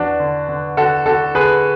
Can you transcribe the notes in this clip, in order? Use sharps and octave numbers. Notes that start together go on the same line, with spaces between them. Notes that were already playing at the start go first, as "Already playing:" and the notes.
Already playing: E2 D4 F#4
D3
D3
D3 F#4 A4
D3 F#4 A4
D3 G#4 B4